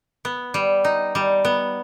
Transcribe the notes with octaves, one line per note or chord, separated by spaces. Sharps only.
B3
G3
D#4
G3
B3